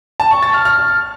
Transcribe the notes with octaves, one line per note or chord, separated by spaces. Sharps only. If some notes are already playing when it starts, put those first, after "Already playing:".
A5
C#6
A6
F6
F6